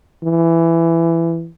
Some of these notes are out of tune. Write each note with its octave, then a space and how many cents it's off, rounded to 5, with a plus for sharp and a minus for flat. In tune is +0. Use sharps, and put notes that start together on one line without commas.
E3 +15